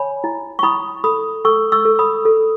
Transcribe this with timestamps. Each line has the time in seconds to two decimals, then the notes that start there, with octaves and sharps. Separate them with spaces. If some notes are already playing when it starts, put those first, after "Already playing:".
Already playing: C#5 G#5 B5
0.24 E4
0.59 C#6
0.63 E4 B5 D#6
1.04 A4 B5 D#6
1.45 A4 C#6 E6
1.72 C#6 E6
1.85 A4
1.99 B5 D#6
2.25 A4